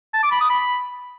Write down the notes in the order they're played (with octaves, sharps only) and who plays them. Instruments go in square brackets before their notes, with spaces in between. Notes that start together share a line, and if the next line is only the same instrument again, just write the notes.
[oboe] A5
D6
B5
D#6
B5